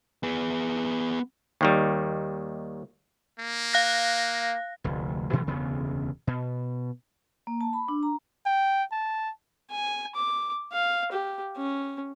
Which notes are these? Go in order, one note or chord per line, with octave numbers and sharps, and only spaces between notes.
B3 G#4
D#2 D#3 G3
A#3
F5 F#6 A#6
F1 D2
B2 E3 F#3 A3
E1 D2 C#3 B3
B2
A#3
A5
B5
D4
A#5
G5
A5
G#5
D6
F5
G4
C#4